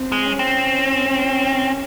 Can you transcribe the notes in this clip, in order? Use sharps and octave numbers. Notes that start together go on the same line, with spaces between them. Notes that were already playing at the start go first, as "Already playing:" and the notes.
Already playing: C4
G#3
C#4
C4